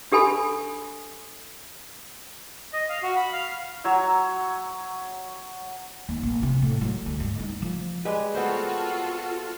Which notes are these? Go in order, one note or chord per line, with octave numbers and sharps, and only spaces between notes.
D4 G4 A4 G#5 B5
D#5
F5
F#4
B5
F5
F#3 C#5 A#5 E6
D#2
A#1
C3
A2
F#3
D2
G2
D#4
F3
G3 G#3 B4
B3 C4 F4 F#4 A4 C5